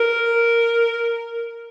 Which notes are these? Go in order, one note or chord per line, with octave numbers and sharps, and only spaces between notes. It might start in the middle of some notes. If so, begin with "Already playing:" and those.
Already playing: A#4